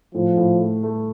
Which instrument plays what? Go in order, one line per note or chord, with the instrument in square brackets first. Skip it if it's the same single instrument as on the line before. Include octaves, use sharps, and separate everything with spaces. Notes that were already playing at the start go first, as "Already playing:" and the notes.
[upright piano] A2 [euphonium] F3
[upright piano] A2
A3
A3